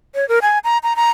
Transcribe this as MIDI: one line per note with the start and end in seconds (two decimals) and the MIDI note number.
0.15 0.27 73
0.29 0.39 70
0.42 0.59 80
0.64 0.78 82
0.83 0.96 82
0.96 1.11 82